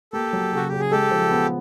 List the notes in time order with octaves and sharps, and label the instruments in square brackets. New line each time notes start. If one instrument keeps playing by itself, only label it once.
[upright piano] A#3 [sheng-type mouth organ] G4 A4
[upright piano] F#3
[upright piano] C#3 [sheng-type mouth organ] F#4
[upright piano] C#3 [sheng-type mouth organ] G4
[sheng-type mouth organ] G#4
[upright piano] G#3 [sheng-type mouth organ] G4 A4
[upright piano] F3
B3